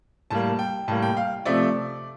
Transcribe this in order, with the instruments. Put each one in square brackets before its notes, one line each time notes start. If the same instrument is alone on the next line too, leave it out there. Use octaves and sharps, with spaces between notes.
[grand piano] A2 G3 A#3 A5
G5
A2 G3 A#3 A5
G5
F5
C3 F3 A3 D5